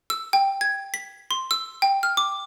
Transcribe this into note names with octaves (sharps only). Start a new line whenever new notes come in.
E6
G5
G#6
B6
C6
E6
G5
F6
D6